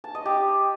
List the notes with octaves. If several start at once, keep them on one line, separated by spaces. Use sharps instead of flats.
A5
D#5
G4